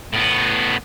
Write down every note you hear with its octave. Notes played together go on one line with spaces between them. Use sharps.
A2 B3